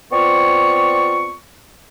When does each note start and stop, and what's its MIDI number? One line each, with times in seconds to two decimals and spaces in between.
0.12 1.33 59
0.12 1.33 60
0.12 1.33 65
0.12 1.33 74
0.12 1.33 85